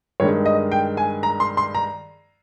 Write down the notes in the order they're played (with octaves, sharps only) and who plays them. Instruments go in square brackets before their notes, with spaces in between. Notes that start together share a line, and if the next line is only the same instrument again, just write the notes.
[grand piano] G2 D#3 G#3 C#5
D#5
G5
G#5
A#5
C6
C6
A#5